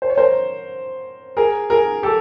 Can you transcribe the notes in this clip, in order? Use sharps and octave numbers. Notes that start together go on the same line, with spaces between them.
C5
C#5
A#4 C5
G#4 A#4
G#4 A#4
G4 A4